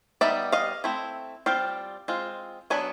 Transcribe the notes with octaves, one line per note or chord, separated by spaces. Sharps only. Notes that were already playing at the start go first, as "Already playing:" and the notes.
G3 B3 D#4 D5 E5
D#5 F5
A3 C4 E4
G3 C4 F4 F5 G5
G#3 C4 F4
F#3 B3 D4 G#5